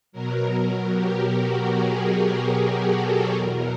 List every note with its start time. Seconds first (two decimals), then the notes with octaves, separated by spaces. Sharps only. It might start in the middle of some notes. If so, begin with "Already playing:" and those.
0.12 B2 F#3 A#4
0.93 G4
1.33 F#4
1.73 G#4
2.54 G#4
2.93 A4
3.34 E2 B2 F#3 A#4